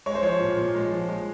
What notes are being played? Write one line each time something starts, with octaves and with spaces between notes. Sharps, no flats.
G#3 C#5
C5
F3 C#5
A#2
A#2
G#3
F3
G#3